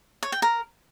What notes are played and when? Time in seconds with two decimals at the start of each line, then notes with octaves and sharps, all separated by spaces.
0.23 C#5
0.32 G5
0.42 A#4